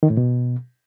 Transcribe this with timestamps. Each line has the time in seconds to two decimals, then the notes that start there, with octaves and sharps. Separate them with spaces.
0.03 D#3
0.10 A2
0.17 B2